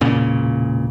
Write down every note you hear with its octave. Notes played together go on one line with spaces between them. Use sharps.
E1 A#2 C#3